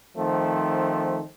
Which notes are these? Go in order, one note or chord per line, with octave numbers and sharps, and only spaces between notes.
D#3 F3 A3 C4